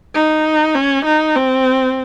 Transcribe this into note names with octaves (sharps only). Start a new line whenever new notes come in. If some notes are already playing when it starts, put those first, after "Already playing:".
D#4
C#4
D#4
C4